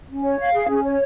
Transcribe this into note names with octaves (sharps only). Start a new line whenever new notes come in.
C#4
C#5
F5
G#4
C#4
C#5